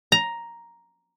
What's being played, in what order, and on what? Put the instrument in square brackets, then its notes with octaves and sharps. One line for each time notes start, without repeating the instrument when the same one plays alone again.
[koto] A#5